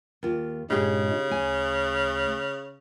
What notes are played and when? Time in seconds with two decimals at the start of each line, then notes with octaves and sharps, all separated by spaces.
0.23 D#2 F4
0.70 G2 A#2 C#3 G#3 D#4 G4 G#4
1.31 D2 G#5